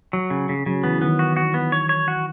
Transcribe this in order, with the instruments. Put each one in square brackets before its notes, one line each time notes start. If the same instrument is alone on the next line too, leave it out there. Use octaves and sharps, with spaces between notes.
[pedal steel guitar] F#3
C#3
C#3
[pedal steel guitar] C#3 [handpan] F#3
[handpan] E3 [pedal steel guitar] B3
[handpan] D#3 [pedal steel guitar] B3
[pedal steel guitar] F#4
F#4
B3
C#5
C#5
F#4